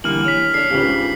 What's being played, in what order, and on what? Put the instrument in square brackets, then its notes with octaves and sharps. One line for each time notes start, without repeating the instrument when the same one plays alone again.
[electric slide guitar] D3 G3 A#3 [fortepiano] E3 [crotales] F6 F#7
[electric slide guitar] C#5 [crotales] F6 B6
[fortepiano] D4 [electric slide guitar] A4 C#5 [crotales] C7
[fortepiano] C#2 G#2 C#3 [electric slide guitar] G4 B4